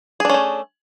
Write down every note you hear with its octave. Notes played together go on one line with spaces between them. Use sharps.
A3 C#4 D4 G#4